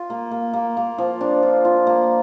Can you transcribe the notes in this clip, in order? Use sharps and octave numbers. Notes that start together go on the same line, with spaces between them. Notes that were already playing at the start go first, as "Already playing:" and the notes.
Already playing: F4
A#3
A#3
A#3
A#3
F3
D4
F4
F4
A#3